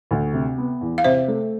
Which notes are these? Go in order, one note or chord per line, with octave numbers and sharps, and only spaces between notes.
D2
C3
B3
E2
F5
C3 C5 E5
A3